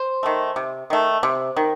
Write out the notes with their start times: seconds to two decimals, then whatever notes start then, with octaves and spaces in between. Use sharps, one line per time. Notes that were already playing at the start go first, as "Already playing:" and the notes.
Already playing: C5
0.23 D#3 A3
0.56 C3
0.90 D#3 A3
1.23 C3
1.56 D#3